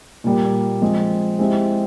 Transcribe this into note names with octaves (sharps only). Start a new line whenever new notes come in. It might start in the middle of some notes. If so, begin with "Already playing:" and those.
A#2 G3 A#3
F3 G#3 C4
G#3 C4 E4 G4